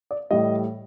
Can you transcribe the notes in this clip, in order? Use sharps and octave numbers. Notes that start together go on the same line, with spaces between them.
D5
A2 E3 G3 D#5